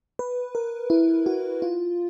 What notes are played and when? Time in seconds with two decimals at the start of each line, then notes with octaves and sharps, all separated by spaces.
0.19 B4
0.55 A#4
0.90 E4
1.26 F#4
1.62 F4